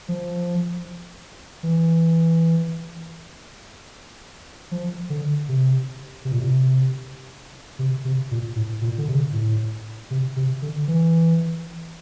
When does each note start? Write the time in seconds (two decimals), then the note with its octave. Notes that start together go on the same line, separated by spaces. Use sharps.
0.09 F3
1.63 E3
4.72 F3
5.10 D3
5.49 C3
6.25 C3
6.32 A#2
6.40 C3
7.79 C3
8.05 C3
8.31 A#2
8.56 A2
8.81 A#2
8.98 D3
9.08 C3
9.33 A2
10.11 C3
10.36 C3
10.62 D3
10.88 E3